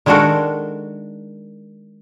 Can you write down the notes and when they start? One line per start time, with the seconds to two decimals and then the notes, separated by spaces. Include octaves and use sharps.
0.06 D#3 G#3 D4 F#4 A4 A#4